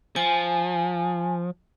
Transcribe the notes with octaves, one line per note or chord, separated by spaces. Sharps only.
F3 G#5